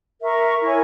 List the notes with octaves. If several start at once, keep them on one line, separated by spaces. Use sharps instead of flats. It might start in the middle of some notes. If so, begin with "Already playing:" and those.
A#4 E5 A#5 C#6
E4 A#4 C#5 G#5